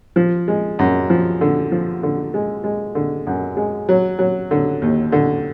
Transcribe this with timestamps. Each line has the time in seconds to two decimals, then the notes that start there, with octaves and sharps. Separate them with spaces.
0.16 F3
0.48 G#3
0.79 F#2
1.10 F3
1.41 D3
1.72 F3
2.03 D3
2.34 G#3
2.64 G#3
2.95 D3
3.27 F#2
3.57 G#3
3.89 F#3
4.19 F#3
4.51 D3
4.82 D#2
5.12 D3